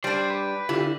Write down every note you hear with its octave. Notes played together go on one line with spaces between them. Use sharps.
G3 D4 C5
B4
D3 E4 F4 G4